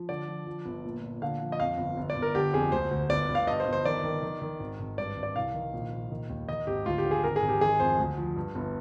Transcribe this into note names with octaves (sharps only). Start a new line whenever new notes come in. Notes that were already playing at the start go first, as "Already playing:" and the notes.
Already playing: F3
D3 D5
F3
F3
G1
A#2
A#2
D3 F5
F3
D#5
F2 F5
G1
G1
D5
G1
A#4
D3 G4
F2 G#4
D2 C5
D2
G1 D5
G1
F5
G2 D#5
C5
G1
C5
D#3 D5
D#3
D#3
D#3
G#1
G#1
G2 D5
G#1
D5
C2 F5
D#3
A#1
A#1
D#3
D#2
D#3 D#5
G#1 G4
D2 F4
G4
D3
G#4
G#1 A#4
G#4
G#1
G4
D#3 G#4
F2 C5
D2
F3
G2
G1